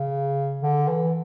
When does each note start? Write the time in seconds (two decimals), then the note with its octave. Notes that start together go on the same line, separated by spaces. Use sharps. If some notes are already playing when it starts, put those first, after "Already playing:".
Already playing: C#3
0.62 D3
0.88 E3